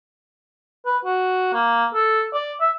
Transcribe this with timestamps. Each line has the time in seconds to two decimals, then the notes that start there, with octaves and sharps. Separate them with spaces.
0.86 B4
1.05 F#4
1.54 A#3
1.94 A4
2.34 D5
2.61 E5